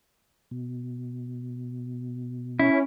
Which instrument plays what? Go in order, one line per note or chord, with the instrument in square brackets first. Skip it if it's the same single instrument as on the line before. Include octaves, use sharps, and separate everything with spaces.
[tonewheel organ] B2
[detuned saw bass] C#4 [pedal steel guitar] E4